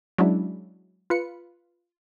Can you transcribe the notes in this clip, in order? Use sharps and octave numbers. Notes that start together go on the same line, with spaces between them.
F#3 G#3 C#4 D4 E4
F4 B4 C#7